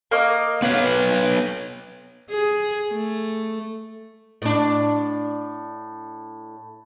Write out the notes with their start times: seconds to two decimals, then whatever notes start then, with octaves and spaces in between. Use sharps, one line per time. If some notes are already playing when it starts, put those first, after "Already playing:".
0.11 A#3 D#5 D6
0.62 B3 B4 C#5 F5
2.30 G#4
2.92 A3
4.42 A2 D4